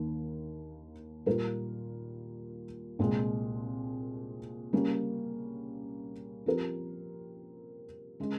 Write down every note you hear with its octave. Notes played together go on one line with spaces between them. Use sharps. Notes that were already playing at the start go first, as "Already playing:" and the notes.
Already playing: D#2 D#3 A#3
A#2 G3 A#3 F4 A#4
C2 A#2 G#3 C4 F4
C#3 G3 A#3 C#4
F3 C4 G4 A#4
C#3 G#3